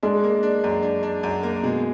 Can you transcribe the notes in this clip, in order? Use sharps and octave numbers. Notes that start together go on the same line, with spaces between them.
G#3 D4
A#3
D4
F#2
D4
D4
F#2
A#3
B2 G#3